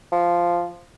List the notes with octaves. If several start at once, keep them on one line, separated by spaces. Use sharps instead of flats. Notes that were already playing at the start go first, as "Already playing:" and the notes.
F3